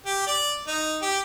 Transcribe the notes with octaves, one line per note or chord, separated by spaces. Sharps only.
G4
D5
D#4
G4